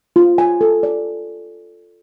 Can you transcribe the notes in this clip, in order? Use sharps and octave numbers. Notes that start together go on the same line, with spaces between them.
F4
G#5
A4
D5